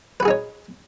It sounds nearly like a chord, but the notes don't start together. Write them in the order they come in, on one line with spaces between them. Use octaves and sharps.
B4 F#4 G#4 D#4 C#5